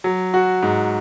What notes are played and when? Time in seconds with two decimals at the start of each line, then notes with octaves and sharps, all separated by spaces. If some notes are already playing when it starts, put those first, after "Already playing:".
0.04 F#3
0.34 F#4
0.63 G#2